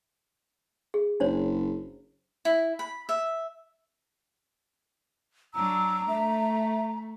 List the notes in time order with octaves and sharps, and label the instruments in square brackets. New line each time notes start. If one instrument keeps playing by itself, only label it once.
[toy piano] G#4
[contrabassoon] F#1 [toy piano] D4 C5 C#5
[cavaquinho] E4
B5
E5
[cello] F#3 D4 [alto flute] A#5 [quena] E6
[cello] A3 [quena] E5